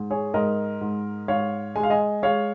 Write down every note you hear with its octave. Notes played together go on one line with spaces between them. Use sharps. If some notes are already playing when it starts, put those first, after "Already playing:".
Already playing: G#2
G#4 C#5
G#2 A#4 D#5
G#2
G#2 C#5 F5
G#3 G#5
F5
D#5 G#5
G#3 C#5 F5